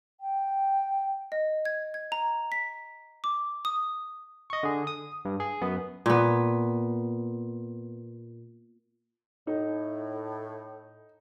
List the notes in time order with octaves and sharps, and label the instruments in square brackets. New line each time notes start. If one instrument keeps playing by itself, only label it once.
[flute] G5
[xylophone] D#5
G#6
G#6
A#5
B6
D6
D#6
[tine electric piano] D#5 C#6
D3 G#4
D#6
G2
G#4
F#2 B3
[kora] A#2 B3
[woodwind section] A2 [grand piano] D#4